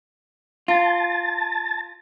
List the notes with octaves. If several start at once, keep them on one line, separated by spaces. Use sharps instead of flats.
F4 A5